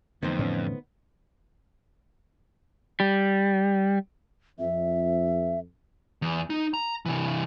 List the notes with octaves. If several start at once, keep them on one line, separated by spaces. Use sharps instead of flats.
F2 D3 E3 A3 B3 D#4 C5
A2 C#4
G3
F2 E5
E2
D#4
A#5
C3 E3